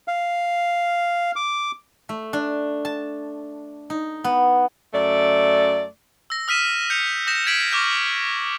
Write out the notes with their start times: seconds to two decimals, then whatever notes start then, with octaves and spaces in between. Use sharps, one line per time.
0.08 F5
1.36 D6
2.09 A3
2.33 D4
2.85 A5
3.90 D#4
4.24 B3
4.93 F#2 A3 D5
6.30 E6 A#6
6.48 D#6 F6 B6 D#7 E7
6.90 G6 C#7 F7
7.27 D#6 G6 A#6 E7
7.46 G#6 B6 D7 F#7
7.72 C#6 D6 F6 G6